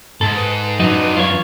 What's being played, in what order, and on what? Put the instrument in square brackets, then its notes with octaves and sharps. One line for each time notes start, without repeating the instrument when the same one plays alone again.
[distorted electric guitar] G#2 [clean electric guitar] A4
[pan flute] B4
[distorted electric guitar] F#2 D4 [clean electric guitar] F#3 D#4
[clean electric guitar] F4 C#5